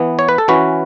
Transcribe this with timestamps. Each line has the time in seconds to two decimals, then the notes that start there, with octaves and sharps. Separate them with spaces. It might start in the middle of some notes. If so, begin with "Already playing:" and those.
Already playing: E3 B3
0.19 C#5
0.29 B4
0.38 A4
0.48 E3 C#4 F#4 B4